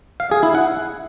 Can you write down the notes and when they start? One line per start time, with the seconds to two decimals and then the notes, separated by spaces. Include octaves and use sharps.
0.20 F5
0.31 G#4
0.43 E4
0.55 F#5